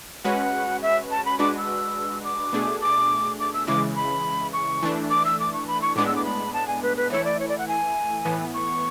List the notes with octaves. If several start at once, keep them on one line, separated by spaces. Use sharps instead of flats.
G#3 C#4 F#4 B4 F#5
E5
A5
B5
G#3 D4 F#4 B4 D6
E6
D6
B2 A3 D4 G#4
D6
D6
E6
C#3 E3 G#3 D6
B5
C#6
E3 A3 D4
D6
E6
D6
C#6
B5
C#6
A2 G#3 B3 D4 D6
E6
D6
B5
A5
G#5
B4
B4
E3 A3 E4 C#5
D5
C#5
D5
F#5
G#5
A2 E3 B3
C#6